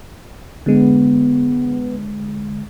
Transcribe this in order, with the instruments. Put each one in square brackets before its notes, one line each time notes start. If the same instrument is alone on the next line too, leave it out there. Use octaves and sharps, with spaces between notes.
[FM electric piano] D3 G#3 [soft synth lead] B3